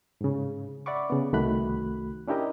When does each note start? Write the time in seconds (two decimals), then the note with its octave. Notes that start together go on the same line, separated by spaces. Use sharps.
0.21 G#2 C#3
0.86 D5 E5 F#5 B5 C#6 D6
1.10 C#3 B3
1.33 C2 D#3 A3 F#4 B5 F#6
2.28 C#4 D4 E4 G4 A#4 D#5